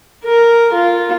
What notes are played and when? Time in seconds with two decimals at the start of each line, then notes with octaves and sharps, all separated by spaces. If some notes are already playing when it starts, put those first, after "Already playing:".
0.24 A#4
0.73 F4